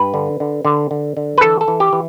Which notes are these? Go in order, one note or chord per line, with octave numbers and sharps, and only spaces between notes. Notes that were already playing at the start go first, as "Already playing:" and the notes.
Already playing: G2 B4
D3
D3
D3
D3
D3
B4
E3 A4
A4
E3
G4
E3